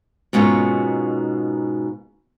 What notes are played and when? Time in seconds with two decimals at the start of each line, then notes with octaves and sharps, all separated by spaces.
0.33 G#2 B2 A#3 C#4 F4